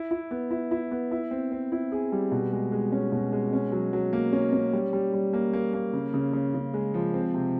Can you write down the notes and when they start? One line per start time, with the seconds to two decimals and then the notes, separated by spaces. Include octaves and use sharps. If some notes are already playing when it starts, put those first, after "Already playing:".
Already playing: E4
0.11 E4
0.31 B3
0.51 E4
0.71 E4
0.91 B3
1.11 E4
1.31 C4
1.52 C4
1.72 E4
1.92 G#4
2.12 G3
2.32 B2
2.52 G#3
2.72 G#3
2.92 C#4
3.12 B2
3.32 G#3
3.53 C#4
3.72 F#3
3.93 F#3
4.13 A#3
4.33 C#4
4.52 C#4
4.73 G3
4.93 G3
5.13 G3
5.33 A#3
5.53 A#3
5.73 A#3
5.93 C#3
6.14 C#3
6.33 C#3
6.54 C#3
6.74 G#3
6.94 F3
7.14 C4
7.34 C3